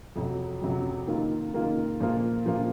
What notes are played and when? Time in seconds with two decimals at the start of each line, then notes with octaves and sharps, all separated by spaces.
0.16 F2 C3 F#3
0.61 F2 C3 F#3
1.07 D#3 A#3 F4
1.53 D#3 A#3 F4
2.00 A#2 F3 A#3 F4
2.46 A#2 F3 A#3 F4